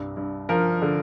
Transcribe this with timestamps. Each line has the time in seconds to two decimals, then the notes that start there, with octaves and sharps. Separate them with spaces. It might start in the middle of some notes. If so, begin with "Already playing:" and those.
Already playing: C2 G2
0.17 G2
0.49 F3 A#4
0.82 D3